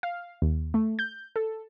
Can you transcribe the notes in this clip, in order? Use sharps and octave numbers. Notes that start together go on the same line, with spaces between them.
F5
D#2
A3
G6
A4